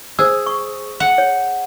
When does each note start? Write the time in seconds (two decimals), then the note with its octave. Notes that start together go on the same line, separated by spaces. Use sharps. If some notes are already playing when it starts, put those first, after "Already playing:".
0.19 G#4 C5 E6
0.46 C#6
1.00 F#5
1.18 C#5